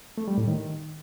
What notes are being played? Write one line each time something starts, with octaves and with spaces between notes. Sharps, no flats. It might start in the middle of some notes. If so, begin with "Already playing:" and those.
A3
G3
A2
D#3